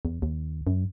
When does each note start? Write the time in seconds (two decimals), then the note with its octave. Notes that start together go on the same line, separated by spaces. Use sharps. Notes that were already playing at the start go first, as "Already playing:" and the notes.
0.05 E2
0.22 D#2
0.67 F#2